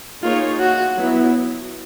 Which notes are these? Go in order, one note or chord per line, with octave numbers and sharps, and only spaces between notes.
A#3 D#4 F4 G#4 C#5
F#4
F#3 B3 E4